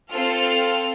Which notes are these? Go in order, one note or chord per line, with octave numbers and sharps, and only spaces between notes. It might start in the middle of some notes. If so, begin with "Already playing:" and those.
C4 F4 A4 F6